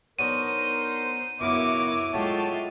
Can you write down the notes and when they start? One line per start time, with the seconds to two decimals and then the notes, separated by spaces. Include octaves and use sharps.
0.19 F#3 B3 D4 D#4 A#4 C5 D#7
1.40 C#2 F#2 B2 E4 F#4 A#4 C#5 D6
2.13 F#3 G#3 A3 F4 E5 G5 A5